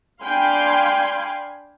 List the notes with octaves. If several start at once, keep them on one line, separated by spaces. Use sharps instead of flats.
D4 F5 G5 G#5 B5 C6